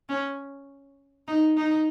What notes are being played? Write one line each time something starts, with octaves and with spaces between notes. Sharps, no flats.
C#4
D#4
D#4